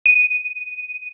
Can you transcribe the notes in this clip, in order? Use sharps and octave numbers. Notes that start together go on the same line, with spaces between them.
D#7